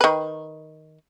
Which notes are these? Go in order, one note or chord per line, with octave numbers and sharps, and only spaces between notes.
D#3 B4